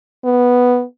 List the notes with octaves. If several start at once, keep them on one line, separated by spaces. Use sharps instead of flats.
B3